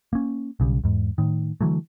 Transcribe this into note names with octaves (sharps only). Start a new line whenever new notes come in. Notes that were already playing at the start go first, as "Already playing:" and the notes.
A#3 C#4
B1 C#3 G3
E2 G#2
A2 D#3
D3 E3 F#3 A3